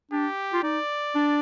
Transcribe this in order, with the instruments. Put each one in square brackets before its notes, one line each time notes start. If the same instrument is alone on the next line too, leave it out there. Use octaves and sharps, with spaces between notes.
[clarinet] D4 [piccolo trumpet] G4
[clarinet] F4
[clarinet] D#4 [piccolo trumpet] D5
[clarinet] D4